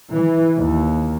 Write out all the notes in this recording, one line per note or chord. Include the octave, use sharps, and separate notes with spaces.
E3
D#2